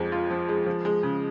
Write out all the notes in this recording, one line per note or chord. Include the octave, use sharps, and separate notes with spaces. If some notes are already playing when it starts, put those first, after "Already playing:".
Already playing: F2 F3 G#3
F4
F3
G#3
F3
G#3
C#3